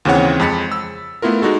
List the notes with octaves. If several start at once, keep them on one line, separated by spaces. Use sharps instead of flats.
D#2 C#3 E3 C4 C#5 F#5
F2 G#3 B5 A6 B6 C#7
E6
A3 B3 E4 F4 A#4
G#3 D#4 F#4 A4